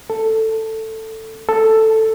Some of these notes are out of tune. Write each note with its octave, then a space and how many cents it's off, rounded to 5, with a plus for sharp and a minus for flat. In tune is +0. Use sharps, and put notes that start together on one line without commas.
A4 +10
A4 +5